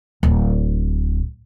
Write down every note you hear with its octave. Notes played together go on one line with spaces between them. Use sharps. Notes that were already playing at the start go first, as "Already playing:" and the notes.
D1